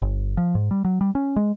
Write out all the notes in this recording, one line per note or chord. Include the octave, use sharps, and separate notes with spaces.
G1
F3
G#2
G3
F#3
G3
C#4
G#3